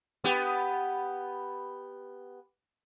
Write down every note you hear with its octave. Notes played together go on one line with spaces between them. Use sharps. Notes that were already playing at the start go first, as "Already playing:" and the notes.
B3 G4